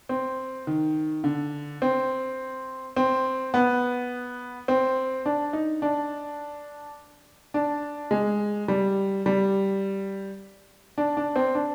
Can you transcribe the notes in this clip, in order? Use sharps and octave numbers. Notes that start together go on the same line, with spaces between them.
C4
D#3
D3
C4
C4
B3
C4
D4
D#4
D4
D4
G#3
G3
G3
D4
D4
C4
D4